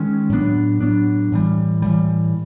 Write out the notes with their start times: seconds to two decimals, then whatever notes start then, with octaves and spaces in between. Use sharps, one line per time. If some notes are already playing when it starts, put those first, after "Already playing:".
Already playing: D#3 G#3 C#4
0.30 A2 F#3 B3 D4
0.81 A2 F#3 B3 D4
1.32 A2 E3 G3
1.82 A2 E3 G3